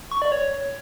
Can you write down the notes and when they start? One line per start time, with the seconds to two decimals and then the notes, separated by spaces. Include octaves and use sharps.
0.11 C#6
0.22 D5
0.32 C#5